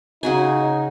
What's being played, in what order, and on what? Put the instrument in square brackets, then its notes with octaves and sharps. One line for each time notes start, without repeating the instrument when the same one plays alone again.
[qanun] C#3 F#4 G#5 [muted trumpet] D#4